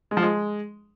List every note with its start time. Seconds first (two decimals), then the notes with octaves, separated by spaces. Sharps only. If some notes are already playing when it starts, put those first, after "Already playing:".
0.11 G#3
0.17 F3
0.23 G#3